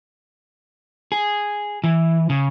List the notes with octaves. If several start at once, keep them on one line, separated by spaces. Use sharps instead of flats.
G#4
E3
C#3